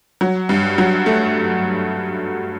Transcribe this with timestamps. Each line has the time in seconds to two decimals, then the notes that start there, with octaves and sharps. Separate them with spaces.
0.21 F#3
0.49 G2
0.78 F#3
1.06 A3